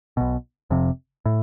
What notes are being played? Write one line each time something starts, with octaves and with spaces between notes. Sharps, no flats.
B1 B2
F1 F2 C3
A2